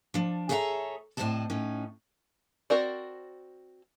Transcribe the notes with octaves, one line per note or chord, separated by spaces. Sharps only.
F3 D4
G#4 A4 C#5 E5 F5 A#5
A2 C3 C5 D5 D#5 A5
A2 C#4 D#4
C4 F#4 A#4 D5